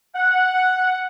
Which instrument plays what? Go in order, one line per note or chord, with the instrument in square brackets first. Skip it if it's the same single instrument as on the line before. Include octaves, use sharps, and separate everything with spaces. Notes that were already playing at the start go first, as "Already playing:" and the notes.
[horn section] F#5